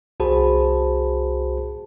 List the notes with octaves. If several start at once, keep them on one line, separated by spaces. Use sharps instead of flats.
C2 F#4 G#4 C5 A5 B5